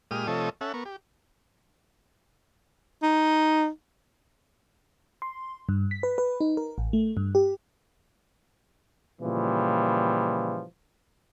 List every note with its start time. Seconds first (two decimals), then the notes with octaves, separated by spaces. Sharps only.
0.11 A#2 G#3 G4 D#6 F6
0.27 C3 F3 A3 A4 C#5 D#5
0.61 C#4 A4 E5 F#5
0.74 B3 A#4 C#6
0.85 G4
3.03 D#4
5.22 C6
5.69 G2
5.91 B6
6.03 B4
6.18 B4
6.41 D#4
6.57 A#4
6.78 A1
6.93 A3
7.17 G2
7.35 G4
9.21 A#2 C#3 E3 F3 G3